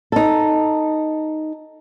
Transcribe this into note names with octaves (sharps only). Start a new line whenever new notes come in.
D#4 A4